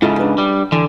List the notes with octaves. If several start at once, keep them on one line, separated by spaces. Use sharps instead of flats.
G#2 C#3 E4 F4 A4
D4 B4
G3
D3 E3